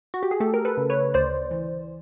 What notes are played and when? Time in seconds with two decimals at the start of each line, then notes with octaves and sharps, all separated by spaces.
0.14 F#4
0.23 G4
0.31 G#4
0.40 A3 G4 A4
0.54 A#4
0.65 A4 B4
0.77 C#3
0.90 B4 C#5
1.14 D2 C5 D5
1.51 E3